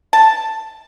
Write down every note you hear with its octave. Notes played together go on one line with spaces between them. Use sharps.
A5